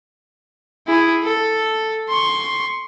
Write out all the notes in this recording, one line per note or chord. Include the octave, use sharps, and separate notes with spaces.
E4 G#4
A4
C6 C#6